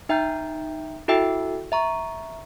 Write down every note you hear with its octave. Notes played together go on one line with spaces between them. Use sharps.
D#4 E5 G5 A#5 F6 G6
E4 F#4 A4 E5 G5 E6
E5 A#5 C#6